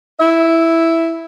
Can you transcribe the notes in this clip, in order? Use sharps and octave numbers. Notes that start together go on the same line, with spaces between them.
E4 E5